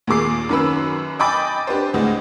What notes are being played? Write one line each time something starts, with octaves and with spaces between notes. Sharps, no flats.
D#2 A#2 G#4 D6 C7
F#2 D#3 C#4 B4 B5 E6
D#5 G5 G#5 B5 D6 A6
D4 G4 B4 C5
D2 A2 G#3 D#5